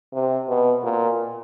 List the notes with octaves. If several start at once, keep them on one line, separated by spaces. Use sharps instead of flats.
C3
B2
A#2